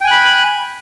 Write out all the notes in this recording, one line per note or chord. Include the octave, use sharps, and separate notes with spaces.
G5 G#5 B5 F#6